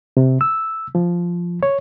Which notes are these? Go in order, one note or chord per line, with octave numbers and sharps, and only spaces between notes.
C3
E6
F3
C#5